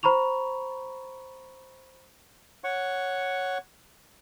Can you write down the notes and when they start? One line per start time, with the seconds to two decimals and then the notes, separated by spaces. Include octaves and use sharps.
0.03 C5 A#5 B5 C#6 F7
2.64 C#5 F#5 C#6